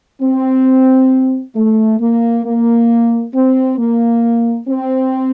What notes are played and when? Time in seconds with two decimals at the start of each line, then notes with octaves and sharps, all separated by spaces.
0.22 C4
1.55 A3
2.00 A#3
2.45 A#3
3.34 C4
3.78 A#3
4.68 C4